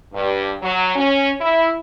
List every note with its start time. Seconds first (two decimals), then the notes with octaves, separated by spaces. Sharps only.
0.13 G2
0.62 F#3
0.95 C#4
1.41 E4